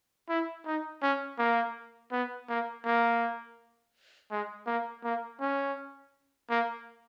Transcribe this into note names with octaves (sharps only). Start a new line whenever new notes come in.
E4
D#4
C#4
A#3
B3
A#3
A#3
G#3
A#3
A#3
C#4
A#3